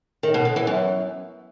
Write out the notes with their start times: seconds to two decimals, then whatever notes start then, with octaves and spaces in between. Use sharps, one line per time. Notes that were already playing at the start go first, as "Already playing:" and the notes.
0.23 D#3
0.34 B2
0.45 D3
0.56 E3
0.67 F#2